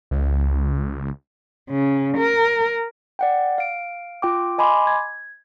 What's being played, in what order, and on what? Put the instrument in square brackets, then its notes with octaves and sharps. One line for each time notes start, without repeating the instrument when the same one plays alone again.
[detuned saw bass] C#2
[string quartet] C#3
A#4
[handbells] D5 F#5 G5
F5 D7
F4 G5 D6
D#5 G#5 B5 C6 D6
G#6